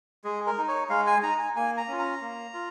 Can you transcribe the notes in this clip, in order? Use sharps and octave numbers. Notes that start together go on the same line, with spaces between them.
G#3 G#4
A#4
D#4
C#5
G#3 F5
G#5
D#4 A#5
G#5
A#3 G#5
A#5
C#4 F4
A#5
A#3
F4